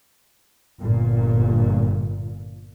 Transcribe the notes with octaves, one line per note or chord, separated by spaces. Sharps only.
G1 A#2